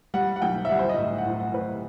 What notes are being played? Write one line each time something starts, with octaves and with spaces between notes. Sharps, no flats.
G3 F#5
F#5
B1 G5
E5
G3 F#5
C5
D#5
A2 E5
F#5
A2
F#5
A2 B4
C5